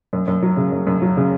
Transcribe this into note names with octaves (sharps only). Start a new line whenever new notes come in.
F#2
F#2
F#3
C#3
F#2
F#2
F#3
C#3